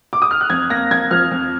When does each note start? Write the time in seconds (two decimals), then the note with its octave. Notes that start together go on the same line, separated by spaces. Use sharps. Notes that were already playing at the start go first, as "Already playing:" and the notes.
0.13 D6
0.22 D#6
0.31 F6
0.41 F#6
0.50 F2 G#6
0.70 A#3 A#6
0.90 F2 G#6
1.11 F3 F6
1.31 F2